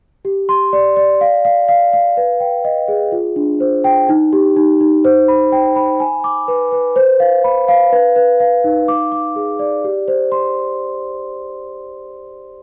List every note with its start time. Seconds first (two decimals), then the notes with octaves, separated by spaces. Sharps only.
0.25 G4
0.49 C6
0.73 D5
0.96 D5
1.21 F5
1.45 F5
1.69 F5
1.93 F5
2.17 B4
2.40 G5
2.64 D#5
2.88 G#4
3.12 F4
3.36 D4
3.60 C5
3.84 G5
4.09 D#4
4.33 G4
4.56 D#4
4.81 D#4
5.05 C5
5.28 B5
5.52 G5
5.76 B5
6.00 G#5
6.24 D6
6.48 B4
6.72 B4
6.96 C5
7.20 F5
7.44 B5
7.68 F5
7.92 B4
8.16 B4
8.40 F5
8.64 D#4
8.88 D6
9.12 D6
9.36 G#4
9.59 D5
9.84 G4
10.08 C5
10.32 C6